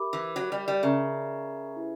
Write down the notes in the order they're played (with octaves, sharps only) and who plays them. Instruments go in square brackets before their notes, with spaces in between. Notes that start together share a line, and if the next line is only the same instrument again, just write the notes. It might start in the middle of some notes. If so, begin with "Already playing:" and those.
Already playing: [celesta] G4 A#4 E5 B5 D6
[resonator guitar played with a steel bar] E3
F#3
G3
G3
[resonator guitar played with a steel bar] C#3 [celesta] A#4 E5 A#5 C#6
[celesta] E4 G4 B4 E5